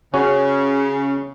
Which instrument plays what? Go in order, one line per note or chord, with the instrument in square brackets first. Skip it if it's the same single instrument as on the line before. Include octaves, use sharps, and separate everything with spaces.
[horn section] C#3 [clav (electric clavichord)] C#4 F#4